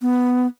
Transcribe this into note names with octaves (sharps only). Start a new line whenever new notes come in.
B3